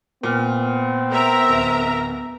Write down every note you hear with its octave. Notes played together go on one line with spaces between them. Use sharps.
A#2 B3 C4 F6
A#4 E5 A#5
D1